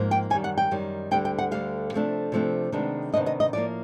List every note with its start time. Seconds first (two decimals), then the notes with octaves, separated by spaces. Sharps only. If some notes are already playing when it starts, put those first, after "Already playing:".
Already playing: G#2 F3 A#3
0.11 G5
0.30 F#2 D#3 G3 G#5
0.44 F#5
0.58 G5
0.71 F#2 D#3 G3
1.11 D2 D3 G3 G5
1.25 G5
1.39 F#5
1.51 D2 D3 G3 F5
1.93 C3 F3 A3 D4
2.32 C3 F3 A3 D4
2.72 C3 D#3 G#3 B3 D4
3.13 C3 D#3 G#3 B3 D4 D#5
3.26 D#5
3.40 D#5
3.53 A2 F3 A#3 D5